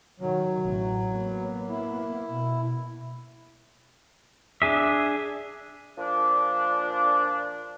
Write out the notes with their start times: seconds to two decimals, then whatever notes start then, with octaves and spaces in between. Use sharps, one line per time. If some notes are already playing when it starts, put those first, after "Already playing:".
0.20 D#3 F#3
0.62 A1
1.09 A#3 B3
1.69 E4
2.29 B2
4.62 D4 G#4 E5
5.97 A#2 F3 D4